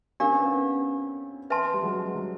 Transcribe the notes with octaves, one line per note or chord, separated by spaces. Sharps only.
C#4 D4 G4 A#4 D5 F5
C4
B3 C#4
B4 E5 A5 C6
G3
F#3 G#3
F#3